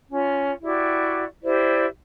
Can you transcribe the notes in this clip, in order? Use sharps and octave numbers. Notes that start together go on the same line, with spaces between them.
C#4 F4
E4 F#4 G4 D5
E4 G4 C5 D5